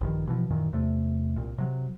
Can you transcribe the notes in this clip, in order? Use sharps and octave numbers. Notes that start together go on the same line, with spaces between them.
A#1 G2 D#3
B2 E3 F3
F#2 A#2 D#3 E3
E2 C3 A3
C2 A#2
C3 F#3